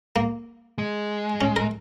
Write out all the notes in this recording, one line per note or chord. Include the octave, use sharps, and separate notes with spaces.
A#3
G#3
C#4
A#4